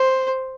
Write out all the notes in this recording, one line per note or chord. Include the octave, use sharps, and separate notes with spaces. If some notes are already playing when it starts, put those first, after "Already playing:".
Already playing: C5